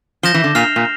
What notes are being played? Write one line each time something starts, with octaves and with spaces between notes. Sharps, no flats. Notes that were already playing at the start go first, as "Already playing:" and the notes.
F3 G6 A#6 E7 G7
E3
D3
A#2 F6 C7 F7
A#2